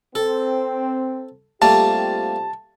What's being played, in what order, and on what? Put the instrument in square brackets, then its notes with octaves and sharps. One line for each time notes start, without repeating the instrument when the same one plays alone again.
[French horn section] C4 [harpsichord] A4
[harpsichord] G3 A3 A#3 [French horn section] C4 F4 G4 [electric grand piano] A5